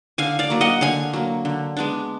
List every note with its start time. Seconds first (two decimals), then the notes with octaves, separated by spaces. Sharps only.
0.18 D3 F5 G#5
0.39 D5 F5
0.50 F#3 A#3
0.61 D#5 F#5
0.81 D3 F5 G#5
1.13 F#3 A#3
1.45 D3
1.77 G#3 B3 D4